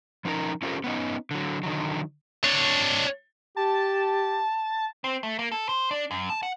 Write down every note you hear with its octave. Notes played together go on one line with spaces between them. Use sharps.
F3 C#4 D#4 A#4 A#5
C#4 F4 G4 A4 A#4 C5
B3 C#4 D#4
D3 F#3
D3 D#3 F#3
D4 C#5
G4 A5
C4
A3
A#3
A4
C5
D4
F#2
A5
F#5